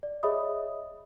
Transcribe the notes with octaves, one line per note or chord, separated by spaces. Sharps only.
D5
G#4 C#5 D#5 E5 B5 D#6